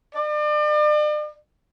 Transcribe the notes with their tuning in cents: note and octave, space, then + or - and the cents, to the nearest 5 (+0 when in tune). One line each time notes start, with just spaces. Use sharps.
D5 +40